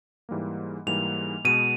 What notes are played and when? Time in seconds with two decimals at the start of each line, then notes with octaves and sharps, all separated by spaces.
0.29 G#2 E3 G3 A#3
0.86 G#2 E3 G3 A#3 F7
1.44 B2 G#3 B3 D#7